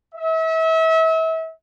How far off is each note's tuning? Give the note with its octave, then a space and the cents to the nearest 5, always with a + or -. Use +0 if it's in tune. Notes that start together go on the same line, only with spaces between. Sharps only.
E5 -35